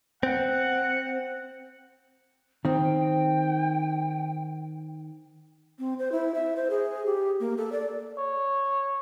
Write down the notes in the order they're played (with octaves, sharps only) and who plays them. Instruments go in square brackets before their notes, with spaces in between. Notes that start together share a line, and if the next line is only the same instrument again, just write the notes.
[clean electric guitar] C4 [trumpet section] F#5
[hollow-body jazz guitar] D#3 C4 [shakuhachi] G5
[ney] C4
C5
E4
E5
C5
G#4
G4
A#3
A4
D5
[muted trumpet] C#5